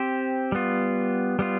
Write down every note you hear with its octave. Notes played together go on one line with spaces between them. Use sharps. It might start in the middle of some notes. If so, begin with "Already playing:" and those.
Already playing: C4 G4 C5
G3 B3 F4
G3 B3 F4